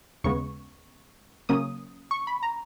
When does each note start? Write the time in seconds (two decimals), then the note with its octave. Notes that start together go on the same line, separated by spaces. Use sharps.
0.24 D#2 C#3 G#3 B3 C#6
1.49 C#3 F#3 A#3 C#4 D#6
2.11 C#6
2.27 B5
2.43 A#5